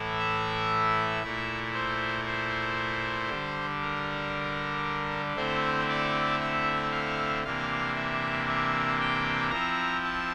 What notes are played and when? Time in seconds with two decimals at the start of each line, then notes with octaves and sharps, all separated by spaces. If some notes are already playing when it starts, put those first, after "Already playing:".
Already playing: A2 E3 A3 E4
0.19 E5
1.23 A#2 A3 E4
1.74 C5
2.26 C5
3.29 D3 G3 D4
3.81 A#4
5.36 D3 A3 C4 E4 C5
5.89 D5
6.40 E5
6.92 F5
7.44 C3 E3 A#3 D4 F5
7.96 E5
8.48 E5
9.00 G5
9.51 F3 C4 E4 A#5
10.04 A5